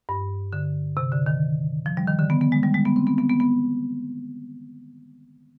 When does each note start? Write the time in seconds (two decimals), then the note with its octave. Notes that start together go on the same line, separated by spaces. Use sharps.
0.09 G2
0.53 D3
0.97 C3
1.12 D3
1.26 D#3
1.86 F3
1.97 G3
2.07 D#3
2.19 D3
2.30 B3
2.41 B3
2.52 G#3
2.63 G3
2.74 G#3
2.85 B3
2.96 C4
3.07 B3
3.18 B3
3.29 B3
3.40 B3